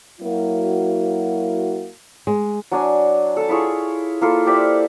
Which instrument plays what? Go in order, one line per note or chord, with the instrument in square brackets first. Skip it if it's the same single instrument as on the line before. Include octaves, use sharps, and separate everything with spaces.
[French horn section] F#3 A#3 E4 F#4
[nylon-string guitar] G#3
[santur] F#3 D4 G#5
A4 A5
E4 F4 G#4 C#5
A#3 E4 F4 A4
G4 C5 D5 E5